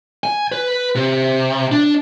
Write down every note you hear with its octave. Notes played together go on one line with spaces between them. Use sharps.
G#5
B4
C3
D4